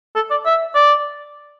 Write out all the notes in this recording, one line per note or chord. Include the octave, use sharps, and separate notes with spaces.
A4
D5
E5
D5